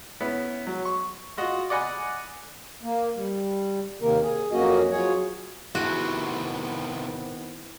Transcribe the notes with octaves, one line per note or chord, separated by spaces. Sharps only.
B3 C#4 E4
F#3
C#6
F4 F#4 D#5
D5 D#5 F#5 G#5 B5
A#3
G3
D#2 C3 D#3 A#3 A#4
G#4
F2 F#3 A#3 C#4 F#4 D#5
F3 F#3 G#4 C#5
A2 C3 D#3 B3 C4 E4 F#4 G#4